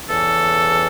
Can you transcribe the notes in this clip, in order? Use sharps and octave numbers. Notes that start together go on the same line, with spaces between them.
E2 C#3 E3 A4